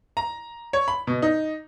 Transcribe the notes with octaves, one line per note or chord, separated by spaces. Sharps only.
A#5
C#5
B5
B2
D#4